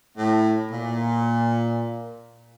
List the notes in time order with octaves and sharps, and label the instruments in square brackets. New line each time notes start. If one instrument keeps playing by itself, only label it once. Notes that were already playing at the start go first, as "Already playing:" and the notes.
[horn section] A2
A#2